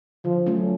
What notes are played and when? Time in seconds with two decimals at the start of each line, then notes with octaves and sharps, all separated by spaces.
0.25 D3 F3
0.46 F#3 A3 C#4